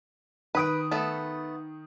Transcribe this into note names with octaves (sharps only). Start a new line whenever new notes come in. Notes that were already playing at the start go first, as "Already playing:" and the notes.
D#3 B4 D#6 D7
A3 B3 A4